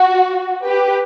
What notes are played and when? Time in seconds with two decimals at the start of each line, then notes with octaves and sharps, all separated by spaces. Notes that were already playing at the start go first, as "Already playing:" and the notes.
Already playing: F#4
0.65 G4 B4